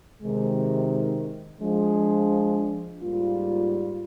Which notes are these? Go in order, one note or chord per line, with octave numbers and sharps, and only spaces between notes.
C3 D#3 G#3
F3 G#3 D4
G#2 G3 A#3 F4